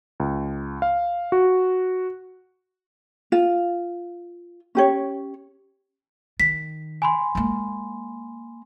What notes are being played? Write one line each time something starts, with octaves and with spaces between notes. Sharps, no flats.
C#2
F5
F#4
F4
C#4 G4 C#5
D#3 B6
G#5 B5 C6
G#3 A#3